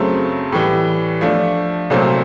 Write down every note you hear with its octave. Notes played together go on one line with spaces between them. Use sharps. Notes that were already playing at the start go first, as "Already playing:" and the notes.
Already playing: F#2 C#3 F#3 A3 C4
A2 E3 G3
F3 A3 D4
C2 A#2 F#3 A3 C4